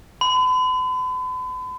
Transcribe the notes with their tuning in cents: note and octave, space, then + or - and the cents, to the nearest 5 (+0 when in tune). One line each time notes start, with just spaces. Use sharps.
B5 +45